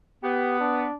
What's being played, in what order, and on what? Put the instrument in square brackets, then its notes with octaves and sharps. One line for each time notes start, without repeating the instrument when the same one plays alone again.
[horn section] B3 [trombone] G4
[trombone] D4